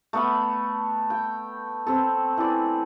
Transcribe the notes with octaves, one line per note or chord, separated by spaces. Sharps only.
A3 B3 B5
G5
C4 A4
E3 D5